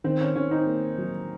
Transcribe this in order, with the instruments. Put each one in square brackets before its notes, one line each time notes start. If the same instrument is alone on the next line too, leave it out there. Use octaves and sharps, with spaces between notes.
[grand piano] D#3 [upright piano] C4
[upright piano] C#4
[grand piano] D#3 [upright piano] C#4
[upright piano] C4 D#4
[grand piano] A#3
F#3